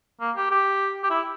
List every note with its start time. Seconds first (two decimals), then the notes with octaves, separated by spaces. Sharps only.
0.21 A#3
0.36 G4
0.51 G4
1.03 G4
1.10 E4